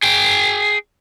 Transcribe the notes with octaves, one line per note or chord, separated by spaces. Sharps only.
G#4 G5